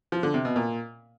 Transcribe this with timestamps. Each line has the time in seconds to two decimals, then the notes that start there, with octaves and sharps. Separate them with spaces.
0.12 F3
0.23 D3
0.34 C3
0.45 B2
0.56 A#2